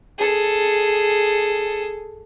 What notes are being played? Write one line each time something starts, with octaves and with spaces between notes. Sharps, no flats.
G#4 A4